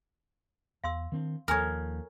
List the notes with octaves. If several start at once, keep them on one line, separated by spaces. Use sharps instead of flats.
E2 F5 C6 E6
D#3 C4 D4
D#2 F3 A4 A#4 C#5 G#5 D#6